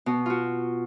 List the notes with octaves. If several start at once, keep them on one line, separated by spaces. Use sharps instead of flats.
B2
F4 F#4